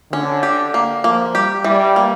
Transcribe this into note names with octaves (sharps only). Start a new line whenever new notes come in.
D3 C#4
G4
A#3
F3 A#3
G3 G4
E3 G3
A#3